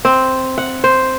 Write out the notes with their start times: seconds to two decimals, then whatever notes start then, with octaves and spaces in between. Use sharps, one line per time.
0.05 C4
0.58 F#5
0.84 C5